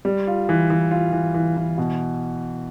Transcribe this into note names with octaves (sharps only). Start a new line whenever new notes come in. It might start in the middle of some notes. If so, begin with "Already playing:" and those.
G3
F4
E3
E3
F4
E3
E3
E3
B2